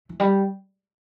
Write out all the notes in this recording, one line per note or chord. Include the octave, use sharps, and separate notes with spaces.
E3
G3